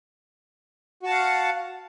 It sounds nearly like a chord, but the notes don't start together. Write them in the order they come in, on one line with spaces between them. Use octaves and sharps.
F#4 A5 F#5 F5